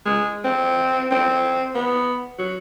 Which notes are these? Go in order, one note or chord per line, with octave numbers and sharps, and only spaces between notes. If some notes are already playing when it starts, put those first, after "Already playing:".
G#3
C4
C4
B3
F#3